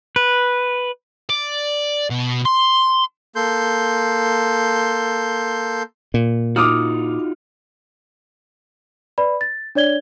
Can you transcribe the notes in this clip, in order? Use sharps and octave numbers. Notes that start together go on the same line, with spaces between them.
B4
D5
B2
C6
A#3 A4 C6 G6
A#2
D#4 F4 F#4 D6 D#6 F6
B4 D5 B5
A6
D4 C#5 D5 G#6 G7